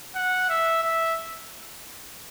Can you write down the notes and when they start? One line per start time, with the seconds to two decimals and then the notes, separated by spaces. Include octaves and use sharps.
0.15 F#5
0.49 E5
0.84 E5